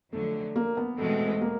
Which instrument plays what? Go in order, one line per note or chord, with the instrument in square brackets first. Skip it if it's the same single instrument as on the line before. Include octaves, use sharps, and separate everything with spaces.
[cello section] F2 D3 F#3 [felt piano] A3
[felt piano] A#3
B3
[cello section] E2 B2 G#3 C4 [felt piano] A3
[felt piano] A#3